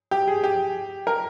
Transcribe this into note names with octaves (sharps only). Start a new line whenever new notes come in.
G4
G#4
G4
A#4